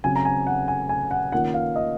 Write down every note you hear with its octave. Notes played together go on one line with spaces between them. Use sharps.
C#3 F#3 C4 G#5
A#5
G#5
F#5
G#5
G#5
F#5
D#3 A#3 C#4 F4 F#5
F5
D#5